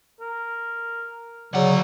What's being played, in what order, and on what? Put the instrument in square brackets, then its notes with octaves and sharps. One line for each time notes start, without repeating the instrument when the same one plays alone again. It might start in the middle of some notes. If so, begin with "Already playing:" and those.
[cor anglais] A#4
[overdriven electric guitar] D2 F#5 [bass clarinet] C#3 [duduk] F#3 [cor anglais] D5